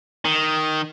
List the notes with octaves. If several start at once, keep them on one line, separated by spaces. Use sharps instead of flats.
D#3